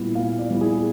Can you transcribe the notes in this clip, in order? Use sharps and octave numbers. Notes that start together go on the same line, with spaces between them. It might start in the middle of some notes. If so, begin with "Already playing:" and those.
Already playing: A#2 G3 B3 E4
A#2 F5
D5
G3 B3 E4
G#4